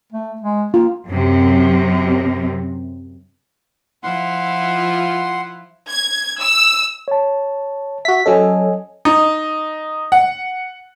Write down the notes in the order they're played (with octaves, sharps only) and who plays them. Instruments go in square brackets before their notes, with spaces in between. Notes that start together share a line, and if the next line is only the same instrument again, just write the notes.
[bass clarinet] A3
G#3
[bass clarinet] A#3 [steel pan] F4
[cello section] F#2 C3
[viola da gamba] F3 E4 F4 [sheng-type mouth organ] F#5 C6
[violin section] G#6
E6
[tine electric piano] C#5 A5
[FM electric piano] F#4 B6 [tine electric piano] E5
[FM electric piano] F#3 C#4 A4 [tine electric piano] D#5 G#5
[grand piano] D#4
F#5